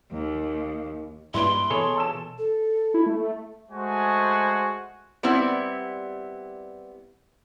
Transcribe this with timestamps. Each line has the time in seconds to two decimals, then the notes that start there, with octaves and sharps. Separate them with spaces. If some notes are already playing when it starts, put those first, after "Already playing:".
0.11 D#2
1.34 G2 G3 A#3 E4 B4 C6 D7
1.70 B2 E3 G#4 A4 C#5
1.96 A5 E6 E7
2.38 A4
2.94 E4
3.06 A3
3.71 G#3 A3 F#4 C5 G#5
5.23 G3 B3 C4 E4